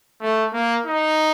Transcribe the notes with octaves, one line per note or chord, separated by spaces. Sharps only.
A3
A#3
D#4